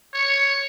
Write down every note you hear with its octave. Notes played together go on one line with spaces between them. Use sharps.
C#5